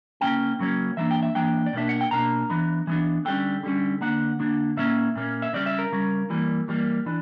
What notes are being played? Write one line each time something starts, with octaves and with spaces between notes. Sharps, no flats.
C#3 F#3 A#3 C#4 G5
C#3 F#3 A#3 C#4
E3 A#3 D4 E5
G5
E5
E3 A#3 D4 G5
D5
B2 A#3 D4 E5
F#5
G5
B2 A#3 D4 A#5
E3 B3 D4
E3 B3 D4
D3 G3 C#4 G5
D3 G3 C#4
D3 A#3 D4 F#5
D3 A#3 D4
A#2 A#3 C#4 E5
A#2 A#3 C#4
E5
C#3 G3 C#4 D5
E5
A#4
C#3 G3 C#4
E3 G3 A#3
E3 G3 A#3
E3 D4